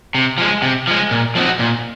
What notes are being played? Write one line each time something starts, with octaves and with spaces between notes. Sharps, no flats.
C3
F3 G#3
C3
F3 G#3
A#2
F3 C4 D#4 F#4
A#2